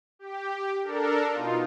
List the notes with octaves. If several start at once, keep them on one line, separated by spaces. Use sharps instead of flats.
G4
D4 A4 A#4
B2 D#4 F4